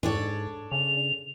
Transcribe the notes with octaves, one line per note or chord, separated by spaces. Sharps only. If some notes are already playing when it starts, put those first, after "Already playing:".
G#2 D4 A4 C#5
C#3 F7